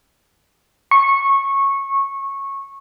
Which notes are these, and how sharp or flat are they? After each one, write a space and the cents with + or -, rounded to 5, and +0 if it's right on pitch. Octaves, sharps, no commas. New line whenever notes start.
C#6 -15